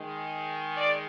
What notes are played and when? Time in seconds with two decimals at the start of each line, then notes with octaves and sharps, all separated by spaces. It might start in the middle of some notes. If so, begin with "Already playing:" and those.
Already playing: D#3 G#3
0.77 D5